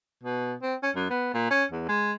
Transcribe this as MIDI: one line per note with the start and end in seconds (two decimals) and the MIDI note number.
0.23 0.54 47
0.62 0.75 60
0.83 0.91 61
0.95 1.06 42
1.10 1.33 59
1.34 1.49 46
1.51 1.64 61
1.71 1.85 40
1.89 2.13 56